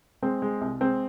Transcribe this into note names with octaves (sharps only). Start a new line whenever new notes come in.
G#3 C4
G#3
C2
G#3 C4